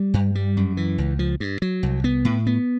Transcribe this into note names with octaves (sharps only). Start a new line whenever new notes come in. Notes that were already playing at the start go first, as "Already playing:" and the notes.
Already playing: G3
G2
G3
F#2
E3
C#2
F3
G2
F#3
C2
B3
A2
B3